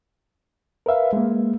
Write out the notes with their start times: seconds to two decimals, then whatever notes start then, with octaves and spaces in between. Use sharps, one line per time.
0.86 A#4 B4 E5 F5
1.13 G#3 A#3